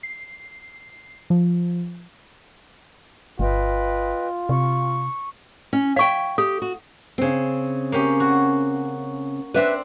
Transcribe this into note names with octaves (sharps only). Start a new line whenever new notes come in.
C7
F3
G1 F4 B4 D#5 G5
C3 C#6
C#4
C#5 E5 F5 G5 C#6
G4 A4
F#4
C#3 C4
A#3 C#4 G4
F#4
C4 D4 B4 E5